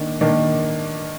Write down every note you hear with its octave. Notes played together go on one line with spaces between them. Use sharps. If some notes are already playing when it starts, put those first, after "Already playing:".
Already playing: D#3 A#3 D4
D#3 A#3 D4